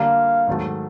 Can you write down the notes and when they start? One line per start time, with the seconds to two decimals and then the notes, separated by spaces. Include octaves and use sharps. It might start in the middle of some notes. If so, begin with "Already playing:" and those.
Already playing: D3 G3 A#3 F5
0.47 G#2 D#3 F#3 A3